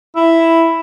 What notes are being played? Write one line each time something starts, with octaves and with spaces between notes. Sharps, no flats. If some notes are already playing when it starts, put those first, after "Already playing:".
E4